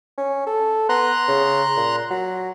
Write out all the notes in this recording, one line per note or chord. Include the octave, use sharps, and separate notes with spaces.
C#4
A4
B3 A#5 C6 F#6
C#3
A#2
F#3